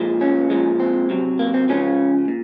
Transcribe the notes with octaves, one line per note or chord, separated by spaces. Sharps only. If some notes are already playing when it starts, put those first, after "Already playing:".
Already playing: A#2 F3 G#3
C#4
A#2 F3 G#3
C4
C3 F#3
A#3
C4
C#3 F3 G#3 C#4
A#2